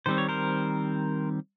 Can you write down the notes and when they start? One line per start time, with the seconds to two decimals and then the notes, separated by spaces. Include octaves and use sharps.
0.06 D#3 G3 C4 C5
0.18 C#5
0.29 A#4 C5